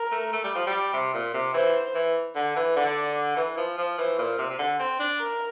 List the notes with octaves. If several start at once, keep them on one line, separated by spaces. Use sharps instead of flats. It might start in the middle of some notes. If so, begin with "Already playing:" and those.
Already playing: A#4
A3
A3
G3
F3
G3
C3
A#2
C3
E3 C5
E3
D3
E3
D3 D5
E3
F3
F3
E3 C5
A#2
C3
C3
D3
C4
D4
A#4